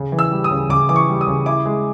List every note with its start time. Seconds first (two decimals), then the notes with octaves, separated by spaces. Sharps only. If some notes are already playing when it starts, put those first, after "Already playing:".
Already playing: C#3
0.12 E3
0.19 E6
0.31 G3
0.44 D#6
0.51 C#3
0.69 C#3 D6
0.89 E3 D6
0.96 C#6
1.09 G3
1.21 D#6
1.27 C#3
1.46 E4 D6
1.66 G#3